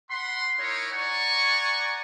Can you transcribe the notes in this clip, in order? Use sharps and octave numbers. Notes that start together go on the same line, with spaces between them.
F#5 B5 C6
D#4 E4 A#4 C#5
D5 F#5 G#5 A#5 C#6